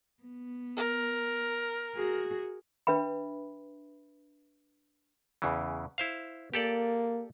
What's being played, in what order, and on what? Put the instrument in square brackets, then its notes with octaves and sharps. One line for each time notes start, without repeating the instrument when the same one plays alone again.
[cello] B3
[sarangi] A#4
[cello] F#4 G#4
[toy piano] D4 B4 E5 B5
[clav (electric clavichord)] E2 C#3 E3
E4 C5 F5
[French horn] A#3 [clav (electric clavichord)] G4 A4 D5